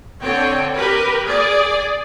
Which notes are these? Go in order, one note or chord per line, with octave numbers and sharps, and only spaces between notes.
D3 C4 C#5 G5
G4 A#4 B4
G#4 D5